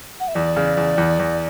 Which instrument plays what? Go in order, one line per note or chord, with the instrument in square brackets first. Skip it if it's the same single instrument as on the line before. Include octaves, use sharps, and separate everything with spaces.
[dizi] F#5
E5
[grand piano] E2 [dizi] D5
[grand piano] C#3
E2
E2
E2